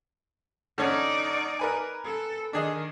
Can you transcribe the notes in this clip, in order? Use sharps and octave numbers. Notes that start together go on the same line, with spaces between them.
D3 C#4 D#4 D5
A#4 B4 G#5
A4
D#3 D4 G#4 D#5